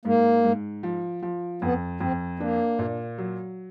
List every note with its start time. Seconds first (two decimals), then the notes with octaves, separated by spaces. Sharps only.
0.05 G#2 A#3
0.44 G#2
0.83 F3
1.22 F3
1.62 F2 B3
2.01 F2 C4
2.40 A#3 D4
2.79 A#2
3.18 F#3